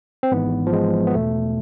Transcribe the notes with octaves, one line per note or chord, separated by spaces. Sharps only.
C4
G#1 G#2 E3 B3
F3
G#3
B3
E2 B2 A3